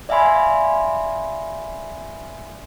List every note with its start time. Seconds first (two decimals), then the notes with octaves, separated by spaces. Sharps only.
0.09 D5 E5 F5 G#5 B5 C6